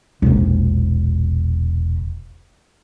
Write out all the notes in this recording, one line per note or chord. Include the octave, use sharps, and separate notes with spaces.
E1 A#1